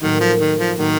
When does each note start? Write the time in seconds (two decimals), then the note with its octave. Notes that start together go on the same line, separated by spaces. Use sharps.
0.01 A2 D#3 F#3 A#3 D#4
0.20 F3
0.40 D#3
0.59 F3
0.77 A2 D#3 F#3 A#3 D#4